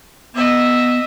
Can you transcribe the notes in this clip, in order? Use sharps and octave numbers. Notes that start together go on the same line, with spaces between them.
B3 D#5 E5